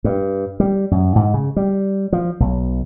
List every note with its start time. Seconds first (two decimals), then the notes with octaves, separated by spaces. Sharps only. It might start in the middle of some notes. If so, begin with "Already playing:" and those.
0.04 G2
0.60 G3
0.91 F#2
1.16 G#2
1.34 C#3
1.56 G3
2.13 F3
2.40 B1